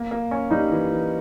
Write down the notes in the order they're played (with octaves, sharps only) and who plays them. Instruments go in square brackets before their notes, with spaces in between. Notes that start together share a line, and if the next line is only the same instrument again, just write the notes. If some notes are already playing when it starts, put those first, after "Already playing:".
Already playing: [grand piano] A#3
A#3
C#4
[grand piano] G3 [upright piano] D#4
[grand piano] E3
E3